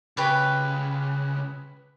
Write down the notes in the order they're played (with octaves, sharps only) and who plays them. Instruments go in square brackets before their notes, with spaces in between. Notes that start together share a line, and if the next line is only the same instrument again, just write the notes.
[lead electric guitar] C#2 C#3 [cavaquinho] G4 B4 C#5